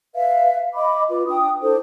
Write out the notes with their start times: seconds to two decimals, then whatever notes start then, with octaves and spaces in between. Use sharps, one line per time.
0.15 B4 E5 F5
0.75 D#5 B5 D6
1.09 F4 B4
1.28 D4 G5 D#6
1.62 D4 E4 A4 C5